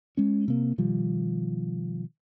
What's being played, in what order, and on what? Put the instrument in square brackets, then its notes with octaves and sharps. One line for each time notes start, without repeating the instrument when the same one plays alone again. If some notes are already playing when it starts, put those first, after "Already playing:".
[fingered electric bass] G#3 C#4
C3 A#3
B2 D#3 F3 G3